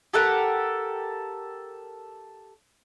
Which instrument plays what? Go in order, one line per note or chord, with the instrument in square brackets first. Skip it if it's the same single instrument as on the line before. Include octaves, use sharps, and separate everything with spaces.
[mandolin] G4 A4 A#4 F#5